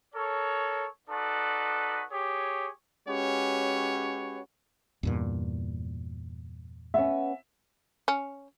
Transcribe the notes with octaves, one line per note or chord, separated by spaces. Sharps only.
A4 A#4 C#5
D#4 F#4 A4 B4 D5
G4 G#4 C#5
G#3 C#4 F#4 G4 B4 C#5
E2 G2 A#2
B3 C#4 E5
C#4